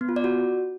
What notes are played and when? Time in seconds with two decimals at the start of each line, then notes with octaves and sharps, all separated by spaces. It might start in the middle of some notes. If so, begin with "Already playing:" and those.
0.01 B3
0.09 F4
0.16 D5
0.24 F#4